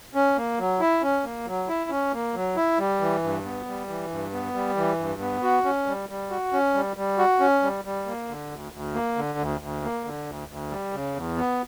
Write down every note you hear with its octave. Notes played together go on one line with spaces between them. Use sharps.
C#4
A#3
F#3
E4
C#4
A#3
F#3
E4
C#4
A#3
F#3
E4
G3
E3
G2
B3
G3
E3
G2
B3
G3
E3
G2
B3
F#4
C#4
G3
G3
F#4
C#4
G3
G3
F#4
C#4
G3
G3
A#3
D3
D2
D2
A#3
D3
D2
D2
A#3
D3
D2
D2
G3
C#3
E2
B3